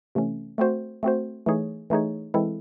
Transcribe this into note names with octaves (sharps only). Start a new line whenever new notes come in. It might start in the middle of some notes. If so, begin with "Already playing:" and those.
C3 E3 A3 C#4
A3 C4 F#4 C5
A3 C4 F#4 C5
E3 A3 D#4 G#4 C#5
E3 A3 D#4 G#4 C#5
E3 G#3 C4 E4 A4